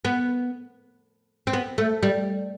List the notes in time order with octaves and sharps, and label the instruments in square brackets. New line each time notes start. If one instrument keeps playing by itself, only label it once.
[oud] B3
C4
B3
A3
G3